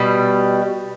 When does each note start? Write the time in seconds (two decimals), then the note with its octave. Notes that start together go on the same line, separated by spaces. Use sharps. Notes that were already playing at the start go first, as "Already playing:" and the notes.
Already playing: B2 G3